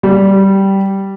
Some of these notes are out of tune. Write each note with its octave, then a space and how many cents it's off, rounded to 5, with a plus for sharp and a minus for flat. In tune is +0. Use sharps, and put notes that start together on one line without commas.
G3 -10